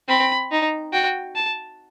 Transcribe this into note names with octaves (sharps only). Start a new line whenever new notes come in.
C4 B5
D#4
F#4 G5
A5